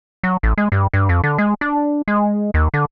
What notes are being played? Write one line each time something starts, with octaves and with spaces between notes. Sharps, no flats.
F#3
A1
G#3
G2
G2
F2
D3
G#3
D4
G#3
D#2
D3